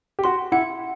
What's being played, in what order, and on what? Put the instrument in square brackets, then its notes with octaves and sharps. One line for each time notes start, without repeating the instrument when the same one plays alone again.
[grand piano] G4
[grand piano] F#4 [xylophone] C6
[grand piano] E4 [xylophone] F#5